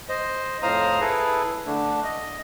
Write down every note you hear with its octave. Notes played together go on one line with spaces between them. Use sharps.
C5 D#5
F2 A2 C5 F5 A#5 D#6
E4 G#4 A4 B4
D3 A3 D4
D#5